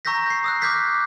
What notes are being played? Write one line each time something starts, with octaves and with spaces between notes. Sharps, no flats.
A#5 C#6 E6 G6 A#6 B6
G6 C7
D#6 E6 F#6
D6 F6 G6 G#6 B6 C7
F#6